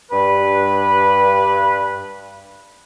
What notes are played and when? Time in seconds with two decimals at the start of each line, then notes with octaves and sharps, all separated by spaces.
0.12 G2 B4